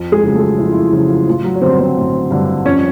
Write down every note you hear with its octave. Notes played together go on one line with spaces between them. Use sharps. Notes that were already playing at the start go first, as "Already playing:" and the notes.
Already playing: F2
G#3 G#4
C#3 F#3
A3 A4
F2 E4
F4
E4
C#3 F3 F#3 F4
A1 F3 F4
F#3 F#4
C#5
G2 D3 G3 C4 C5
C4 C5
A1
G2 D3 G3
F2 C#4 C#5